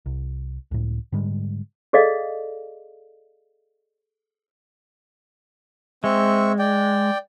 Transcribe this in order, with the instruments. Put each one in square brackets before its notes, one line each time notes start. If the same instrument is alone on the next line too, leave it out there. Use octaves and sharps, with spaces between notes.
[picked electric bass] C2
C#2 A2
G#2 D3 G3 G#3
[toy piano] G#4 A4 D5 D#5 F5
[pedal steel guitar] G#3 [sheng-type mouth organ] C4 E5 C#6
[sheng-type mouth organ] D5 G5